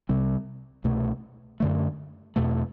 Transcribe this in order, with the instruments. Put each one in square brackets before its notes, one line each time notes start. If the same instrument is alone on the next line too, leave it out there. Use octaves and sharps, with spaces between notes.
[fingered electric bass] C2 C3 G3 C4
C2 B2 A3
F#2 D3 A3
E2 B2 A3